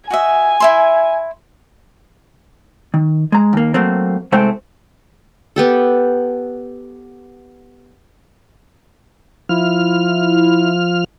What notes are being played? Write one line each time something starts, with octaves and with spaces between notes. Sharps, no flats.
F#4 D#5 E5 G#5
E4 E5 C6
D#3
G#3 A#5
D#2 A#3
F#3 A3 A#3 C4
C2 G#3 A3 C4 C5 G5
B3 G4 A4
F3 E4 F6